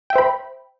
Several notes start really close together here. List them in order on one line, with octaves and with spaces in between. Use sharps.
G5 E5 C5 B5